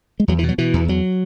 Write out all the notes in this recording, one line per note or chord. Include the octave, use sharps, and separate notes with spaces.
G#3
E2 F#3
E3
B2
F#3
B2 E3
E2
E2 F#3